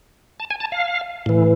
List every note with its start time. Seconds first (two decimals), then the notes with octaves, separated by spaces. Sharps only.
0.40 A5
0.51 G#5
0.60 A5
0.72 F5
1.26 A2 E3